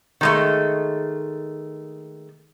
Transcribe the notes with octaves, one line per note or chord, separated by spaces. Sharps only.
D#3 G#3 A3